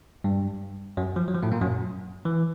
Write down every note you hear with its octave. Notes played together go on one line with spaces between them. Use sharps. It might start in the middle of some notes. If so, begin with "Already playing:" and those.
G2 G3
F#2 F#3
F3
F#3
F3
A2 A3
A#2 A#3
F#2 F#3
E3